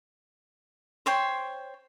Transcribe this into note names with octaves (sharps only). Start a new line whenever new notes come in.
C5 C#5 G5 C6